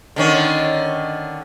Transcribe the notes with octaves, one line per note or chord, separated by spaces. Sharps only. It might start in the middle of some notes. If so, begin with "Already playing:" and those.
D3 D#3 C#4